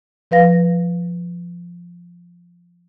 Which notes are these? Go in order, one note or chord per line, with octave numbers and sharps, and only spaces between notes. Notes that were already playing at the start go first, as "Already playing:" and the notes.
F3 B4 F5 A#6